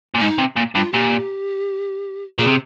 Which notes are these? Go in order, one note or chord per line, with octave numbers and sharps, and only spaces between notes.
A#2
G#2 D#4
C3
A#2
G2 F4
A#2 G4
A#2 G#4
C3